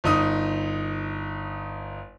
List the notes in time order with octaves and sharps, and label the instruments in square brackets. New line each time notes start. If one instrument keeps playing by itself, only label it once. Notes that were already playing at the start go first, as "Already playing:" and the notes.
[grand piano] G1 D#4 D#6